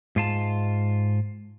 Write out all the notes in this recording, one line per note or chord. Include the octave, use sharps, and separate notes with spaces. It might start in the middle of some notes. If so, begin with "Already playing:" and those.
G#2 F4 A5